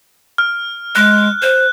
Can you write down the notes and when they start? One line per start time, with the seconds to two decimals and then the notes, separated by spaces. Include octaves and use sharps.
0.38 F6
0.95 G#3 F#6
1.42 C5